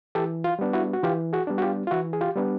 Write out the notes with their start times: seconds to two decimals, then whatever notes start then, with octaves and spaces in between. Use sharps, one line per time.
0.15 E3 G4 A4
0.44 F4
0.59 G3 B3 D4
0.73 E4 F#4
0.93 F#4
1.03 E3 F4 G4
1.33 F#4 G#4
1.47 G3 B3 D4
1.58 F#4
1.62 F4 G4
1.87 F4
1.91 E3 E4 F#4
2.13 G#4
2.21 F4 G4
2.36 G3 B3 D4